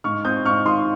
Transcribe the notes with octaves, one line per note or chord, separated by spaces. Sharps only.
G#2 C#6 F6
C4 D#6 G6
G#2 C#6 F6
D#3 C6 D#6